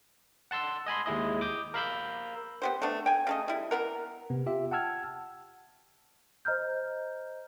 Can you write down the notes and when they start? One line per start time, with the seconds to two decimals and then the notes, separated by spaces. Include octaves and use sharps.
0.51 F#5 A5 C6 E6
0.86 D#5 G#5 B5 C6
1.06 D#2 G#3 E4 D#5
1.41 D6 D#6 G6
1.74 A#4 F5 B5 E6 G6
2.62 B3 G4 C5
2.82 A3 B3 D4
3.06 G5 G#5
3.27 C#3 A3 D#5
3.48 G3 E4
3.71 E3 B3 A#4
4.30 C3 B3
4.46 F4 G4 E5
4.71 F#5 G5 A5 E6 F6 G#6
6.45 C5 D#5 A#5 F6 G6